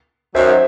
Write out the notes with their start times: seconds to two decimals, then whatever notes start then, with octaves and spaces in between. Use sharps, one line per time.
0.35 F#2 D#3 F#3 C5 E5